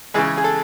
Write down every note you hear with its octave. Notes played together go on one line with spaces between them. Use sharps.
C#3 E3 G#3 G#4
G#4
A4